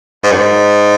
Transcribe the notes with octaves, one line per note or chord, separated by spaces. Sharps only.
G#2
F#2
G#2